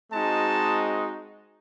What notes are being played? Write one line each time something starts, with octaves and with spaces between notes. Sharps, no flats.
G#3 C4 D#4 F#4 A5